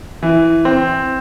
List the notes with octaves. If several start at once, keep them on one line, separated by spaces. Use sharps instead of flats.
E3
C4